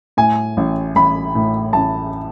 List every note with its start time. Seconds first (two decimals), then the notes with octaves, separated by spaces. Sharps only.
0.17 A2 G#5
0.57 A1
0.96 A1 B5
1.35 A2
1.73 A1 A5